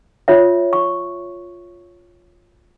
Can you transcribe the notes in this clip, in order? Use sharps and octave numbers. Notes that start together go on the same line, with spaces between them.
F4 C#5 E5
C#6